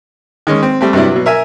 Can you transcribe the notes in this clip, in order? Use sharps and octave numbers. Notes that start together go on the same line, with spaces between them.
D#3 G#3 C#4
C4
G3 A3 C4
G2 C3 F#3 G3 D4 E4
B2 F#3
A#4 E5 G#5